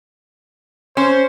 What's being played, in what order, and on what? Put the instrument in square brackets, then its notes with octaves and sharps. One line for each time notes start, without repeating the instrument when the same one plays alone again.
[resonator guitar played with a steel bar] C#4 [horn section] C5